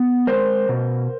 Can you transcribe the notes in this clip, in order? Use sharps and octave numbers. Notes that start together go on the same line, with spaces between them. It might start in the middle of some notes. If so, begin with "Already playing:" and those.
Already playing: B3
G#3 A#4 C5
B2